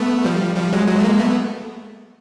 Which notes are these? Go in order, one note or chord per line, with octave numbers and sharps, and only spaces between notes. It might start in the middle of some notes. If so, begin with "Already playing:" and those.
Already playing: A3 B3
F3 G3
F3 G3
F#3 G#3
F#3 G#3
A3
G#3 A#3
A3 B3